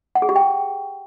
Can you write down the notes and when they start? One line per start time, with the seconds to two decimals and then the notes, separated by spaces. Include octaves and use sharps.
0.15 F#5
0.22 G#4
0.29 G4
0.36 G5